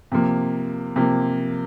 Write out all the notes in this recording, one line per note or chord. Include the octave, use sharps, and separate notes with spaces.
C3 F3 A#3
C3 F3 A#3